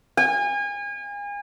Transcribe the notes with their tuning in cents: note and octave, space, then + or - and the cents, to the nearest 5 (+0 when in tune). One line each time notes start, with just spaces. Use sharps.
G#5 -35